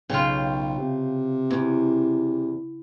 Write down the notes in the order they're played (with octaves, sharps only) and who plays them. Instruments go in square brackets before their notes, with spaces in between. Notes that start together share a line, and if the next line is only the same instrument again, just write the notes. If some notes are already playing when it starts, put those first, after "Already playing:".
[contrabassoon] B1 [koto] C#3 F4 [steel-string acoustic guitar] G5
[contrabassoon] C3
[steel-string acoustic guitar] E2